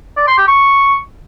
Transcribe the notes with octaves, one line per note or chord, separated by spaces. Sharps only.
D5
C6
G4
C#6